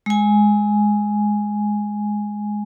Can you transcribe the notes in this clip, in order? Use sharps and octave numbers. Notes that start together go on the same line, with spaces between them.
G#3 G#5